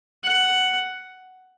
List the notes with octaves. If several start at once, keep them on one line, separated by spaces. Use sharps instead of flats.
F#5